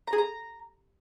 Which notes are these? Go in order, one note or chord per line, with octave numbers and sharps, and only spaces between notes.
A#5
G#4
A#5